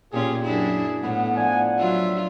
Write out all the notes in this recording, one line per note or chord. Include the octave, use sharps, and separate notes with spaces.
A#2 C#4 F4 G4 G#4
F#2 D4 E4 G#4
A2 B3 F#5
F3 D4 G#5
F#3 F4 E5